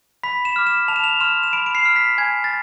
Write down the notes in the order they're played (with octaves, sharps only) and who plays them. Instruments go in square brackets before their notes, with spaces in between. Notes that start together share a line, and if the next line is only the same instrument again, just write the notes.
[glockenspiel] B5 B6
E7
D6 F6
E7
A5 F7
E7
F7
C6 F6 E7
E7
B5 D7
D7
C7
F6
B6
G#5 G#6
A6